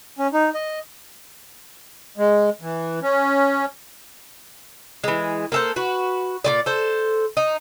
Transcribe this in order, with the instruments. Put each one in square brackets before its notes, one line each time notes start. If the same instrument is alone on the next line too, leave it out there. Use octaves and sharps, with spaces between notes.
[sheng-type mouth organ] C#4
D#4
D#5
[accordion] G#3
E3
C#4
[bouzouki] E3 G#3
A#3 A4 C5
F#4 B4
A#2 G#3 D5
A4 C5
D#4